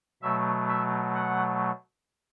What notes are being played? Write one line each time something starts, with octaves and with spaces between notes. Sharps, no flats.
B2 F#3 A3 E5
E5
F#5